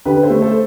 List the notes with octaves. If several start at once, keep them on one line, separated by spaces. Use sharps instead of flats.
D3 G4 B4
A4 C5
A3
A4 C5